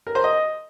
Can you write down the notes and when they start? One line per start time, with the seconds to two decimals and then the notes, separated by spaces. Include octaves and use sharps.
0.07 A#4
0.15 C5
0.24 D#5